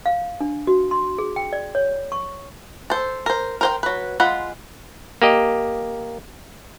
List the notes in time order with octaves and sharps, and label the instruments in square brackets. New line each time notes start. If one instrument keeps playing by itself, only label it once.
[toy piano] F5
D4
F#4
C6
G#4
G5
D5
C#5
C#6
[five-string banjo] A4 C5
A#4 C5
A#4 C5 G5
F#3 B4
G#3 F4 F#5 B5
[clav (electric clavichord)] A#3 G4 D#5